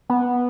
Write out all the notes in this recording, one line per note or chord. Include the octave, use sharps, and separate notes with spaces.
B3